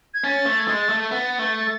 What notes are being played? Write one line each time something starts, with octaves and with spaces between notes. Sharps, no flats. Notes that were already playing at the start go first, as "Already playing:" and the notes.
G#6
C#4 A6
A3
G#6
G#3 A6
A3
B3 A6
A3